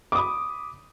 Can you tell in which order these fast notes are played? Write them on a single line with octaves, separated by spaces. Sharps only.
D6 D#6 B5